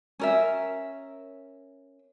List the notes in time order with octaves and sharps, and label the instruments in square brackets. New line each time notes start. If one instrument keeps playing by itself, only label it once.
[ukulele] C#4 A#4 E5